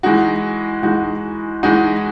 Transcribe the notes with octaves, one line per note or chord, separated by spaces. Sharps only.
E3 G#3 D#4 F#4
E3 G#3 D#4 F#4
E3 G#3 D#4 F#4